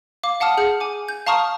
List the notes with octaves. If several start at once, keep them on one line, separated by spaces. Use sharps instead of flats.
F5 D6
F5 F#5 A5 D#6 F6
G#4 F6 G6 C#7
G#5 D6
G6
F5 A5 A#5 C#6 D#6 F6